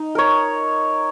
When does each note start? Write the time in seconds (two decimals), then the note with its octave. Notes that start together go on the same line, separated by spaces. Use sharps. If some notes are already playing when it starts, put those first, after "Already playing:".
Already playing: D#4
0.15 A#4 C#5